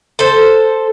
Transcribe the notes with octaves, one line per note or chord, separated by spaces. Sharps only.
A4 C5